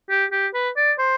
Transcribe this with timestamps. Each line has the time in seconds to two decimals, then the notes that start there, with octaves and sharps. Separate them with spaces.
0.10 G4
0.32 G4
0.54 B4
0.77 D5
0.99 C5